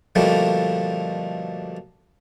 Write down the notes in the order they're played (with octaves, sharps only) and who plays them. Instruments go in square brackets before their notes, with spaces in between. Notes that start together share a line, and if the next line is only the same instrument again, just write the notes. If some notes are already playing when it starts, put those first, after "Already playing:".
[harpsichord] B2 D3 F3 G3 A3 A#3